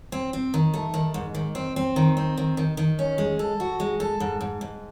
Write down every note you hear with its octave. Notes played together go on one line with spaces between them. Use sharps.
C4
C4
D#3
A3
D#3
G#2
D#3
C4
C4
D#3
C4
D#3
D#3
D#3
C#4
G#3
A4
F#4
G#3
A4
G#2
G#2
G#2